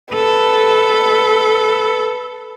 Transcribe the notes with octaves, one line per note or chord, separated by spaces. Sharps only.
A4 B4